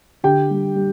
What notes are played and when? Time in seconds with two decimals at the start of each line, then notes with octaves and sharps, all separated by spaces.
0.23 D3 G4 G5
0.50 G3
0.75 G3